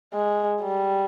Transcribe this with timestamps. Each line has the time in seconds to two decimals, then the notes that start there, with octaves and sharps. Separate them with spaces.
0.13 G#3
0.62 G3